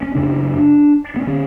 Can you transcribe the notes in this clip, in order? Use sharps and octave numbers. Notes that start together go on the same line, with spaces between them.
C#4
F#2 C#3 D4
B3
D3 C#4